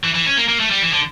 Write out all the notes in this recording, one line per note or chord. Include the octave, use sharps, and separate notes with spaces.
E3
E3
C#4
A#3
A#3
A3
G3
E3
D3